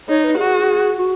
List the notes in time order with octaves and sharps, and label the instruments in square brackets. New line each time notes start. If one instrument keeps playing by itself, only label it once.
[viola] D#4 [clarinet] C#5
[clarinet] B4
[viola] F#4 [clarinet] G#4
[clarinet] F#4